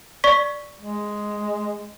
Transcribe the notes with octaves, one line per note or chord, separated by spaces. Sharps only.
D5 C#6 B6
G#3